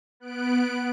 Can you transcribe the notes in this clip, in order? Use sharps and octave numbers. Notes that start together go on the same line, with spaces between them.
B3 F#6 D7